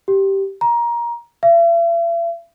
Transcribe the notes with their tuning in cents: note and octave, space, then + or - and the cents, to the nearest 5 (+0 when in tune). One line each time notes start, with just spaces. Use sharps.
G4 -10
A#5 +20
E5 +45